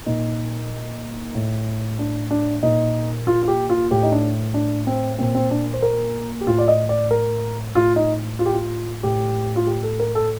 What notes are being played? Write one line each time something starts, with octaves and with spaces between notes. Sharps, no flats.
A#2 D#4
A2
D4
D4
A#2 D#4
F4
F4
G4
F4
A2 G4
D#4
D4
D4
C4
A#2 C4
C4
D4
C5
A#4
G4
A2 F4
D5
D#5
D5
A#4
A2 F4
D#4
F4
G4
F4
A2 G4
F4
G4
A4
A#4
A4